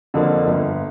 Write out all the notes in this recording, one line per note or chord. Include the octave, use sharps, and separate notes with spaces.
F2 D3 F3 A#3
G1